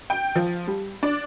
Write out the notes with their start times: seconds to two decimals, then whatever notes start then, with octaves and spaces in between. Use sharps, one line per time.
0.10 G5
0.36 F3
0.67 G3
1.03 D4